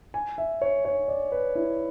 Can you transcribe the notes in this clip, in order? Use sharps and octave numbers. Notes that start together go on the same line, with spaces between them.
G#5
E5
C#5
C#5
D5
B4
E4